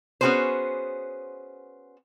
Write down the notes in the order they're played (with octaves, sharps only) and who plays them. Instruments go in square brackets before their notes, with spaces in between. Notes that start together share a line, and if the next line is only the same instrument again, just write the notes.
[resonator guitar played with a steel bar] B3 C#4 F#4 G#4 B4 C5